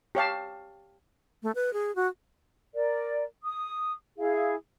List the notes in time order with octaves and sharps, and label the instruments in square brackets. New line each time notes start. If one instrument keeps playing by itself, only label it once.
[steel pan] G4 C#5 F5 A5
[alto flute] A3
B4
G#4
F#4
[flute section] A#4 D5
D#6
E4 G#4 F5